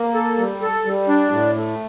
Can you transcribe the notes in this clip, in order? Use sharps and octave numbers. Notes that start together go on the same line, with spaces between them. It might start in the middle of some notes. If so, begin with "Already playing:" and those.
Already playing: A#3
A4
G3
A4
G3
D4
A2
A3